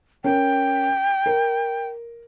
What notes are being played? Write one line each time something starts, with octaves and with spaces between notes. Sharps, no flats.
C#4 A#4 G5
A#4